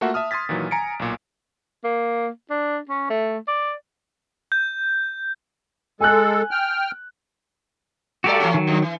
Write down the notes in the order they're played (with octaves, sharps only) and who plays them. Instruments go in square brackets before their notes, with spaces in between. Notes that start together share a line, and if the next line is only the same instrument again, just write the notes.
[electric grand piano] A3 A#3 F4 F#4 E5 F#5
E5 A5 D#6 F6
C6 D#6 G#6 A6 B6
A#2 D#3 E3 F#3
G#5 A#5 C#7 D7
B1 A#2
[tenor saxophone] A#3
D4
C#4
A3
D5
[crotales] G6
[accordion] G#3 A4 [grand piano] G#5 F#6
[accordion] G5 F6
[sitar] G3 A3 D5 [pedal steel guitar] F#4 G4 A4
[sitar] E3 A3 C#4
[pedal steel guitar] D#3 F#3
[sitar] F#2
E3